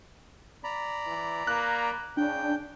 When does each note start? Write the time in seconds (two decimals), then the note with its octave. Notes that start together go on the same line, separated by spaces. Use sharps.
0.64 D5 A#5 B5
1.07 E3
1.47 A#3 F#6
2.17 C#3 D4 G5